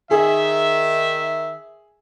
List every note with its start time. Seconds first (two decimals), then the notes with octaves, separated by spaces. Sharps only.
0.11 D#3 G#4 E5